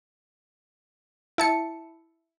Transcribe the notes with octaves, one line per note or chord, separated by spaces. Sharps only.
E4 A5 C#7